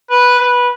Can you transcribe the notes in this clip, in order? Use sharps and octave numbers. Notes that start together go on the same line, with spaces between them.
B4
B4